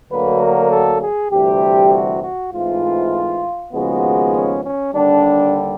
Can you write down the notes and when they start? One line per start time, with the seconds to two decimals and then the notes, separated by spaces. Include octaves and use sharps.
0.11 D2 D3 F#3 A#3 B4
0.41 A#4
0.71 A4
1.01 G#4
1.31 D2 C3 E3 G3 G4
1.93 F#4
2.22 F#4
2.53 G#2 E3 A3 C4 F4
3.73 D#2 C#3 F3 G#3 B3 F#4
4.34 C#4
4.64 C#4
4.95 D#2 D3 G3 D4